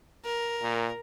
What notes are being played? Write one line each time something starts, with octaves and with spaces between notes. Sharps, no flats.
A#4
A#2